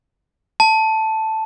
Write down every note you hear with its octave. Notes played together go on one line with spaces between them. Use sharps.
A5